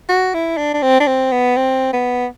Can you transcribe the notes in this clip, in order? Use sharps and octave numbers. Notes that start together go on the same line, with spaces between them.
F#4
E4
D4
D4
C4
D4
C4
B3
C4
B3